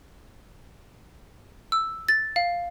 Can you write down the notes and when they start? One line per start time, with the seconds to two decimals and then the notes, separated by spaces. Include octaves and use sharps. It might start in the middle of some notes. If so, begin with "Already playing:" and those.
1.72 E6
2.09 A6
2.36 F5